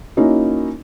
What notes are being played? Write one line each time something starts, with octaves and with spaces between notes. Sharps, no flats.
A#3 C#4 D#4 E4 F#4